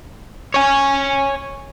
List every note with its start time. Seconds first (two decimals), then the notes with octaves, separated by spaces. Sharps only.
0.54 C#5 G#5